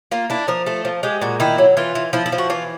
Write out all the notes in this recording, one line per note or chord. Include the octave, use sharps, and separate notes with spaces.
A#3 F4
D4 E4
F3 A#4
A3 A4
F3
G#3 G4
A#2 F#4
D#3 E4
F#3
E3 F4
E3
F3 E4
E4
F3
F#4
E3 F4